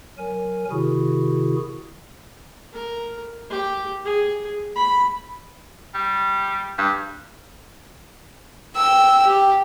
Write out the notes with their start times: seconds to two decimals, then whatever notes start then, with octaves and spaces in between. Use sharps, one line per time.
0.18 F#3 A#4 G#5
0.71 C3 D#3 E4 F#4 G#4
2.73 A#4
3.50 G4
4.05 G#4
4.76 B5
5.94 G3
6.78 G2
8.76 G5 E6
9.27 G4